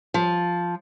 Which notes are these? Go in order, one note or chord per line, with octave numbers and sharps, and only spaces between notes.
F3